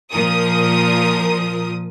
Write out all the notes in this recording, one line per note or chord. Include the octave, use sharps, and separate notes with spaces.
A#2 F3 F4 A#4 D#6